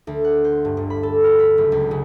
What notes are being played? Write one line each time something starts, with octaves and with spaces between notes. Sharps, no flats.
D2
F#5
C5
G2
G1
B5
A4
F6
B6
F#1
C#2
C#3